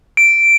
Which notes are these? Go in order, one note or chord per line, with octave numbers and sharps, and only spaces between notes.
D7